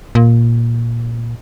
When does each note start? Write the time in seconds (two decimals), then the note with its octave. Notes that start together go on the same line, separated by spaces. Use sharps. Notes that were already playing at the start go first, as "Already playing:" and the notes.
0.15 A#2